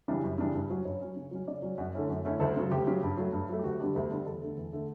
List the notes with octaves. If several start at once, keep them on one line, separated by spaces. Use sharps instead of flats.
C#3 E3 G3 D4
F#2
C#3 E3 G3 D4
G2
F#3 C#4
G2 C#5
F#3 C#4
C#3
F#3 C#4
C#3 D5
F#3 C#4
F#2 F#5
D3 A3 C#4 E4
F#2
D3 A3 C#4 E4
D2 A4
C#3 F#3
D2 G4
C#3 F#3
G2
F#3 A3
G2
F#3 A3
G4
D2 F#4
D3 G3 B3 D4 G4
D2 A4
D3 G3 B3 D4
E2 A4
D3 A3
E2
D3 A3